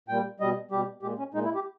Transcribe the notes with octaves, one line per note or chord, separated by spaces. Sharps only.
A#2 G3 G5
B2 G3 D#5
B2 G3 G4
A#2 G#3 G4
C#4
A#2 G#3 D#4
E4
G4